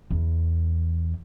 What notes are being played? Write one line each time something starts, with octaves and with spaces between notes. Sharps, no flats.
E2